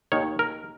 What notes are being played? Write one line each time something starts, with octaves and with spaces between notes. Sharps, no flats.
D#2 D#3 C#5
A#4